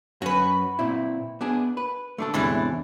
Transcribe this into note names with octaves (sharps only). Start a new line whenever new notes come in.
F#2 C#4 F#4 B4
A#2 C4 E4
B3 D4 G#4
B4
A3 D4 A4
E2 A2 C3 E3 G#3 D4